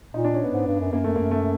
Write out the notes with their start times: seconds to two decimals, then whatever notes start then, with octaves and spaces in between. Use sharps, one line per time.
0.14 A#2 D#4
0.24 D4
0.34 C#4
0.44 B3
0.53 G#2
0.67 G2
0.80 F#2
0.92 F#2 A#3
1.04 F#2 A3
1.16 F#2 A#3
1.31 A3